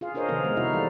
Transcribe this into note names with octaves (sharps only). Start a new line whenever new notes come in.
F4 G#4 F5
D4 G#4 A#4 C5 C#5 D#5
C3 D#3 F3 B3 F4 A#4
D#3 G#3
C3 D#4 E4 F#4 E5 F5
E3 G3 A4 D5